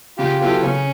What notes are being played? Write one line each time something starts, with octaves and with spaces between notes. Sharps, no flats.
C#3 F4 G4
F#3 B3 E4 F4 G4 A4
C#3 C#4